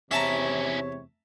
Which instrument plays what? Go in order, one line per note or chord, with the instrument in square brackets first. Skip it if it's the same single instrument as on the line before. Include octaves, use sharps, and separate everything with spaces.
[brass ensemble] E2 C3 C#5 [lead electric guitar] C#4 E4 [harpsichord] E5 A5 A#5